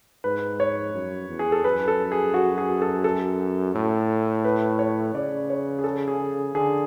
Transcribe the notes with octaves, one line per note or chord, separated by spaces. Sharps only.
G#2 B4
C#5
F#2
E2
G#4
A4
F#2 B4
A4
G#4
F#4
G#4
A4
A4
A2
B4
C#5
C#3 D5
C#5
G#4
A4
G#4
D3 G#4